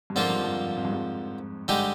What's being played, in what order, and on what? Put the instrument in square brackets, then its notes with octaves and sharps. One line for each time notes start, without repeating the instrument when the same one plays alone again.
[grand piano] G2
[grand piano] F2 G#2 [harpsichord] D3 F3 A#3 F4
[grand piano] G2
F2
G2
F2
G2
F2 G#2
[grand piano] G2 [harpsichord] D3 G#3 D#4 G4